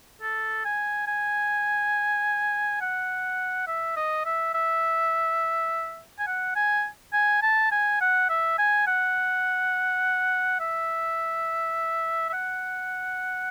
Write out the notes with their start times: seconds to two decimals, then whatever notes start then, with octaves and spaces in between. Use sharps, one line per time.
0.22 A4
0.65 G#5
1.07 G#5
2.81 F#5
3.67 E5
3.97 D#5
4.26 E5
4.54 E5
6.19 G#5
6.27 F#5
6.56 G#5
7.13 G#5
7.42 A5
7.72 G#5
8.01 F#5
8.30 E5
8.58 G#5
8.87 F#5
10.60 E5
12.29 E5
12.33 F#5